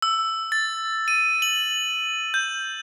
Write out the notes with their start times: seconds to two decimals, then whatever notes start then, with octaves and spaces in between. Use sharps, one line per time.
0.02 E6
0.52 A6
1.08 D#7
1.42 F#7
2.34 G6